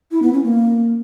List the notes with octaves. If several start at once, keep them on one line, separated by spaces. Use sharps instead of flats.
E4
B3
C#4
A#3